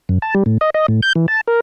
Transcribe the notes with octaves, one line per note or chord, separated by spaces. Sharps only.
F#2
A5
G3
A2
D#5
D#5
A2
G6
E3
A5
A#4